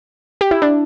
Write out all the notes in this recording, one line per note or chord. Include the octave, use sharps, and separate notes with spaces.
G4
E4
D4